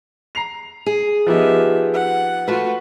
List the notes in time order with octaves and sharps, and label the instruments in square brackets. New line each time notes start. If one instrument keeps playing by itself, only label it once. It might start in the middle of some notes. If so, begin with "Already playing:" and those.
[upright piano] A#5 C7 F7
[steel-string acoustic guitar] G#4
[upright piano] F3 B3 D#4 [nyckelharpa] G4 E5
[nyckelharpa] F#5
[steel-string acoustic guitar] A3 B4 [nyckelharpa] F4 F#4